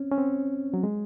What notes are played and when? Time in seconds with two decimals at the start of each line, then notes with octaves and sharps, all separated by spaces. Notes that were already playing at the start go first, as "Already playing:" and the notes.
Already playing: C4 C#4
0.12 C#4
0.18 C4
0.74 F#3
0.83 G#3